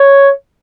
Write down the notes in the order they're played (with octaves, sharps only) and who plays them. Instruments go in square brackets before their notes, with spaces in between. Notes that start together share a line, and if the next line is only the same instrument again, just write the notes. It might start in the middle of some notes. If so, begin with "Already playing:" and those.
Already playing: [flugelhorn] C#5